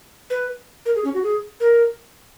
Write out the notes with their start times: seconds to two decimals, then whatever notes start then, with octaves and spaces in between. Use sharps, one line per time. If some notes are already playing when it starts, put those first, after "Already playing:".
0.30 B4
0.86 A#4
0.96 G#4
1.04 C#4
1.14 F#4
1.24 G#4
1.60 A#4